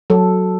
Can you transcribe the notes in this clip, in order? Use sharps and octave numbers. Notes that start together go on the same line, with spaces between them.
F#3 A4